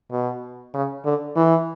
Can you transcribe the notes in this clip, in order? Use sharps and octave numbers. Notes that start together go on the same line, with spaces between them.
B2
C#3
D3
E3